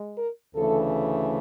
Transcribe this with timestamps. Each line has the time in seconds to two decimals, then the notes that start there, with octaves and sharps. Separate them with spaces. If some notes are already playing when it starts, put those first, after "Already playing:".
Already playing: G#3
0.16 A#4
0.55 D2 C#3 E3 A3 A4